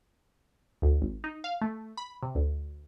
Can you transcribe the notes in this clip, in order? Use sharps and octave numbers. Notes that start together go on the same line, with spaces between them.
D2
G#1
D#4
F5
A3
B5
C3
D2